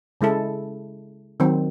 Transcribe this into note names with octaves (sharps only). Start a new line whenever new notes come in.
C#3 G#3 E4 A4
D#3 F#3 C4